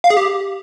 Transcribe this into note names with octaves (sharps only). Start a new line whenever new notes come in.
F5
G#4
G4